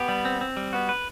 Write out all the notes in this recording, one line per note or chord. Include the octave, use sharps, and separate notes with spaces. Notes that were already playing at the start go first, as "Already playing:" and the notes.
Already playing: B3 G4
G3
C4
C4
G3
B3 F#4
B4